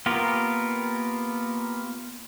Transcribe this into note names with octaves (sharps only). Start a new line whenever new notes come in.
A#3 B3 F4 G4 A#4